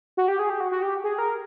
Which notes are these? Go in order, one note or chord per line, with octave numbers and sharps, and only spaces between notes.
F#4
G4
G#4
G4
F#4
F#4
G4
G#4
A#4